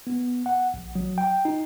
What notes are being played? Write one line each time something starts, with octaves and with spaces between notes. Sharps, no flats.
B3
F#5
A#1
F#3
G5
D#4